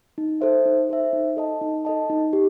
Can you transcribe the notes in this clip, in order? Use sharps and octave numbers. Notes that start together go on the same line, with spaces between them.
D#4
A4 C5 E5
D#4
A4 C5 E5
D#4
A4 D#5 A5
D#4
A4 D#5 A5
D#4
G4